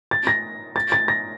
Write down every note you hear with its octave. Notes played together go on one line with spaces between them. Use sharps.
A6
A#6
A6
A6
A#6